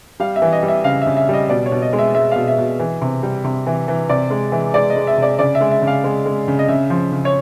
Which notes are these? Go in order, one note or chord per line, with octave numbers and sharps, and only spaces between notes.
G3 F5
E5
E3
D#5
G3
E5
C#3 F5
E5
C#3
E5
G3 D#5
B2 D5
C#5
B2
D#5
G#3
E5
G#3 E5
B2 F5
E5
B2
E3
C3
G3
C3
E3
E3
C3 D5
G#3
E3
G#3 D5
D#5
G#3
E5
C3 D5
C#3 D5
E5
G#3
E5
C#3
F5
G#3
G#3
C#3
D#5
C#3 E5
F3
C#3
C#5